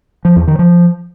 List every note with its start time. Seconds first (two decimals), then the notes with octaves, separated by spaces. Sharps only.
0.25 F3
0.36 E2
0.48 D#3
0.59 F3